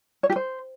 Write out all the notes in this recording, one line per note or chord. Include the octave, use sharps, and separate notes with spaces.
C#5
G4
C5